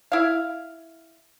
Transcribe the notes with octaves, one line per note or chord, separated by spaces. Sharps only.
E4 F5